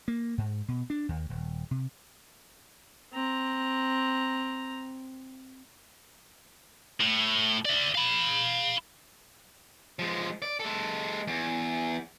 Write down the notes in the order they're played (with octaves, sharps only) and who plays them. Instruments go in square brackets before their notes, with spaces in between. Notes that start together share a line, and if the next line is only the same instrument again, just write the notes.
[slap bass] A#3
G#2
B2
D4
D#2
D#1
C3
[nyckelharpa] C4 A#5
[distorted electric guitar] A2
D5 E5
F5 B5
[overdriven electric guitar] F3 G#3
D5
G#3 A4
E2